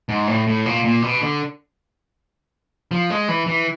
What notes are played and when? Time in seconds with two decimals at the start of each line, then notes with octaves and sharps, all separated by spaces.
0.09 G#2
0.27 A2
0.47 A2
0.66 A#2
0.85 A#2
1.02 B2
1.21 D3
2.91 F3
3.10 G#3
3.28 E3
3.47 E3